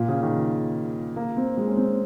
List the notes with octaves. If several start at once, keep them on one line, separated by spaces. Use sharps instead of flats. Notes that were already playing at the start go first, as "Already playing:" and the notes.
Already playing: A#2
C#3
D#3
A#3
C4
G#3
C#4
C4